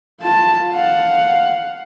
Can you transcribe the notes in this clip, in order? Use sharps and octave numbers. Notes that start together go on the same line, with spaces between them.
F4 A5
F5 F#5